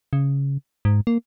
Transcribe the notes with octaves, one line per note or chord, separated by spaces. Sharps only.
C#3
G#2
A#3